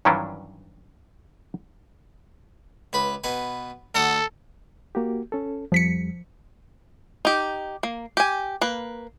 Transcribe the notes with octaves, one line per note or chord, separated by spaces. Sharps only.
G2 D#3 E3 F#3 C#4 D4
C#2 B4 B5
B2 B4 G#5
D2 A4 F#5 D#6
A#3 F#4 G4
C#4 A4
F2 F3 G3 B6 C#7
D#4 G4
A#3
G4 G#5
A#3 B4